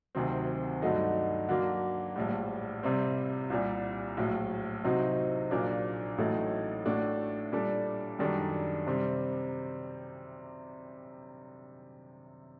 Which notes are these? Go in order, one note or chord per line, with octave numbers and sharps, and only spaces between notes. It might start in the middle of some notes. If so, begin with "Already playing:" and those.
D2 C3 D#3 F#3 C4
G2 D3 F#3 A3 D#4
D3 F#3 A#3
A#1 A2 G3
C3 G3 C4
C2 A#2 G3
A#1 A2 F#3
C3 F#3 C4 D#4 F#4
A#1 A#2 F#3 A#3 D4
A1 A2 F#3 A3 D#4
A2 A3 D4 F#4
A#2 G3 D4 A4
F#2 D#3 G3 D4 A4
C3 G3 C4